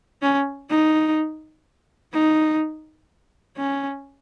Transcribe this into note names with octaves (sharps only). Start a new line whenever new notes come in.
C#4
D#4
D#4
C#4